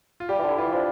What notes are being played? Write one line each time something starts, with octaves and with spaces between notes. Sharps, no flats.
F4
G3 G4
E3
D3
E4
E3 F4
F3 D4